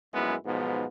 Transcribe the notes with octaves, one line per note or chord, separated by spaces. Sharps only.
A#1 F#2 G#3 B3 E4
B1 G#2 B2 F3 B3